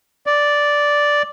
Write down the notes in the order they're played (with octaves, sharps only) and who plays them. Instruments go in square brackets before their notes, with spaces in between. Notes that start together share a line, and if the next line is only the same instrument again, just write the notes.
[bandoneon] D5